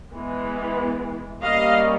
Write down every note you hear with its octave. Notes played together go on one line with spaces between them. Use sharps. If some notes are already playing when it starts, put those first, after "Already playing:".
E3 G#3 B3
G3 A#3 C#4 D#5 F5